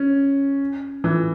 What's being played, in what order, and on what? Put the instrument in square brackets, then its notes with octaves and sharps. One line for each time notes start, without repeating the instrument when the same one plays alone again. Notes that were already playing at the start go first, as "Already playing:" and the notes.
Already playing: [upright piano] C#4
E3